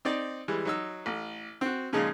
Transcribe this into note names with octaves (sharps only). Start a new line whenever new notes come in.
C4 D#4 D5
E3 G3 G#3
F#3 D#4 E6
A1
C4 F#4
A#2 C#3 F3 G#3 D#4